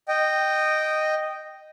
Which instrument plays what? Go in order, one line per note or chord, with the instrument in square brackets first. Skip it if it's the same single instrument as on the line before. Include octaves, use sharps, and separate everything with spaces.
[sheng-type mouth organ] D#5 G5